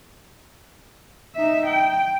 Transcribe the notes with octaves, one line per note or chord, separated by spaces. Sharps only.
D#4 E5
G5